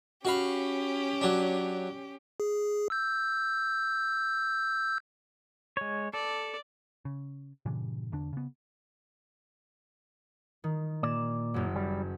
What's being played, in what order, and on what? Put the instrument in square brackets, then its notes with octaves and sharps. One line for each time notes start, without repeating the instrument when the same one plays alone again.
[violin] C#4 G4 [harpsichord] F#4 F5 B5
[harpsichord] F#3 D4
[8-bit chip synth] G#4
E6 G6
[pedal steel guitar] G#3 C#5
[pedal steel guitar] A4 [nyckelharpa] D5
[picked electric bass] C#3
G2 A#2 C#3 E3
E2 D3 D4
C#3 B3
[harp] D#3
[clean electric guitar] A#2 D5 [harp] E7
[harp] F#1 F#2
[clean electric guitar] G3